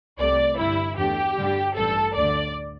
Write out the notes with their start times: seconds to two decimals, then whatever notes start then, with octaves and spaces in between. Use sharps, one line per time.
0.19 C2 C3 A3 D5
0.58 G1 G2 G3 E4
0.97 E2 D3 A3 G4
1.37 G2 D3 G3
1.76 A1 G2 G3 A4
2.15 D2 D3 A3 D5